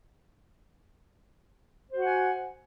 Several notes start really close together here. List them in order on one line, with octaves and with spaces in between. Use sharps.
C5 F#4 F#5 G#5